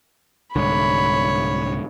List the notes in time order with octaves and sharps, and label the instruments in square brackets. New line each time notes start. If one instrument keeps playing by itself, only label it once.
[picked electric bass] C2 G#2 D3 [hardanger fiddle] C#5 [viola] B5